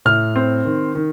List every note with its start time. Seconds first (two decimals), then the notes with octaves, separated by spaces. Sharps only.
0.05 A2 F6
0.36 C4
0.65 D#3
0.95 D#3